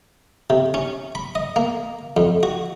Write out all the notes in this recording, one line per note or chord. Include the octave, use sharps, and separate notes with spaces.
C3
C#4
B5
D#5
A#3
F2
F#4